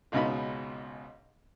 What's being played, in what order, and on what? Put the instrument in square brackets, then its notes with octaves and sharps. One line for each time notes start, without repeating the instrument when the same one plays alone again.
[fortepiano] G#1 C#2 B2 D#4 B5